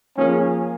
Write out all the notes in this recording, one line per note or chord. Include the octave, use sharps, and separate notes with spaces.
F3 A#3 C#4 F4 G#4